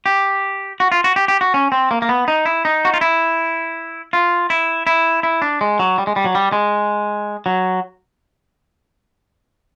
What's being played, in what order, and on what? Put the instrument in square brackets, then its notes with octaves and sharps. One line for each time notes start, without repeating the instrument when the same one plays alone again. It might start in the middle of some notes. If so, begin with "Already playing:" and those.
[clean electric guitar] G4
F#4
F4
F#4
G4
G4
F#4
C#4
C4
A#3
A#3
B3
D#4
E4
D#4
F#4
F4
E4
F4
E4
E4
E4
D4
G#3
F#3
G3
G#3
G3
F#3
G3
G#3
F#3